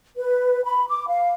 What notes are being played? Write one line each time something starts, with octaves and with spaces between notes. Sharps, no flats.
B4
B5
D6
F5